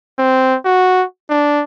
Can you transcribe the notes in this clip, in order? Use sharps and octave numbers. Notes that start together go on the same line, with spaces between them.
C4
F#4
D4